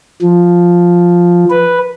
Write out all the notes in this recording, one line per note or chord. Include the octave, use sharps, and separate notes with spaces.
F3
B4